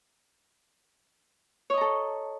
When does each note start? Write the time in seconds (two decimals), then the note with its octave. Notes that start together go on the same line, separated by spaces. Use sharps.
1.70 C#5
1.74 D#5
1.77 A#5
1.81 A4